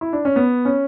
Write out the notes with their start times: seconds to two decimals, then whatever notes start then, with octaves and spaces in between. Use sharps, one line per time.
0.01 E4
0.13 D4
0.25 C#4
0.36 B3
0.65 C#4